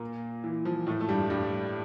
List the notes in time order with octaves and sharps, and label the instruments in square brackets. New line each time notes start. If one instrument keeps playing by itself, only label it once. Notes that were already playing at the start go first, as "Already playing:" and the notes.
Already playing: [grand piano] A#2 A#3
E3
F3
A2 A3
A3
G2 G3
G2 G3